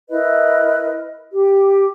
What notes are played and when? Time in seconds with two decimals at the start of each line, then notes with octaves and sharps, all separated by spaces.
0.10 E4 A#4 B4 D#5
1.31 G4